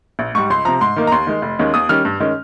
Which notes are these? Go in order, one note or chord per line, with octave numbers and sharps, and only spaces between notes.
A#1
G#2 G3 C#6
C#2 C6
C3 F3 A#5
G#2 C6
D#3 A#3 D#4
A#5
D#2 C6
D#3 G#3
F1
D#2 D#3 G#3 C#4
D#2 D#6
D#3 G3 C#4 F6
G2
D#3 G#3 C#4